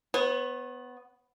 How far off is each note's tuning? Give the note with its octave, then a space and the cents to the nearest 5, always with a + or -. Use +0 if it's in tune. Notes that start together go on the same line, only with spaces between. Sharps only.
B3 +10 C#5 -40